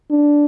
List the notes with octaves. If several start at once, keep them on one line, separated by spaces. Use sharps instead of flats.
D4